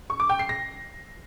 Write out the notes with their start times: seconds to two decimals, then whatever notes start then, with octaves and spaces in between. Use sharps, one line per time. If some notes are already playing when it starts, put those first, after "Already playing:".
0.10 C#6
0.20 D6
0.29 G5
0.39 C7
0.49 A#6